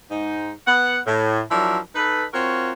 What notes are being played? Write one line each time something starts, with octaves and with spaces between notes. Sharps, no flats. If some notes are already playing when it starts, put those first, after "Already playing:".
G#2 D#4
B3 F#5
A2
F3 F#3 D4 E4 A#4
D#4 A4 B4
C4 F4 F#4 A#4 C#5